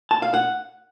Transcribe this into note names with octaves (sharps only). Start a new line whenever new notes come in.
A5
F5
F#5